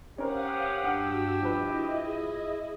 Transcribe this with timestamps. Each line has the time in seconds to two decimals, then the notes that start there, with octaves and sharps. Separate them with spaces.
0.18 C#4 G4 A#4 C5 F5 F#5 D#6
0.84 G2 D4 F#4 F#5 E6
1.42 F3 E4 B4 D#5
2.06 G#4